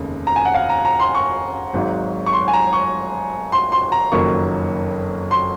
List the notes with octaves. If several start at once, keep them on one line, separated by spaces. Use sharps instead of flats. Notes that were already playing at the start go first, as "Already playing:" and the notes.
Already playing: F1 D#2 C#3 G#3
A#5
G#5
F#5
F5
A#5
A#5
C6
C#6
G#1 G#2 F#3
C#6
C6
G#5
A#5
C#6
C6
C6
A#5
F#1 F2 D#3 F#3 A#3 C#6
C6